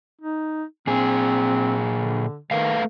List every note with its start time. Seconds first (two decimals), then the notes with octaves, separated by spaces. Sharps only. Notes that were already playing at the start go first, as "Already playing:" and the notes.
0.21 D#4
0.87 A#2 C4 G#4
1.92 D3
2.51 D#3 A3 B4 F5